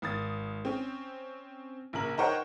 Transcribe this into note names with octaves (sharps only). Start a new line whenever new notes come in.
G#1 D#6 A6
C4 C#4
A#1 C#3 A#4 F#7
D#4 A#4 C5 C#5 F#5 G5